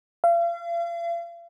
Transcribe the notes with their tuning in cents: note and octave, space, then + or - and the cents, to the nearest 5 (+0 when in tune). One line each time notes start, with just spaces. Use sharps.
F5 -40